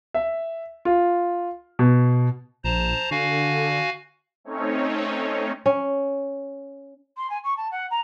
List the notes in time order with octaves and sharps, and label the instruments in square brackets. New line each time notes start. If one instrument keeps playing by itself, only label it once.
[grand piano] E5
F4
B2
[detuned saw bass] A#1 [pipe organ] C5 A5 A#5
[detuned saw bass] D3 [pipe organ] F#4 F5 G#5
[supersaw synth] A3 C4 C#4 D#4 C#5
[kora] C#4
[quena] C6
G#5
C#6
A5
F#5
A#5